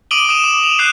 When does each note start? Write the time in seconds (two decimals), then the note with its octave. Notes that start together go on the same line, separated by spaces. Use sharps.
0.11 D6 D#6 D7 D#7 F#7 G7
0.29 D#6 D#7 E7
0.44 D6
0.64 F7
0.79 D#6 F#6 G6 C7 D#7